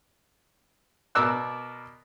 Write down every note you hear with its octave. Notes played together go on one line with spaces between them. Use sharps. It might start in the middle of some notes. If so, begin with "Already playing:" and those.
B2 A#4 D5 E6 F#6